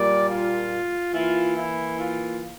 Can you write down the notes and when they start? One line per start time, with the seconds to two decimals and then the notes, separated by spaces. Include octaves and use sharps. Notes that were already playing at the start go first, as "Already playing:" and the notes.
Already playing: A#2 G3 A#3 D5
0.28 F4
1.13 E3 A#3 E4 F4
1.56 E4
1.98 F4